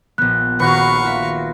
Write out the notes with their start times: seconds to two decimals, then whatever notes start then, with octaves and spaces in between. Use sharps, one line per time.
0.18 A#1 B3 F#6
0.60 D#1 F#3 F#4 B4 F5 C#6
1.03 F4 E5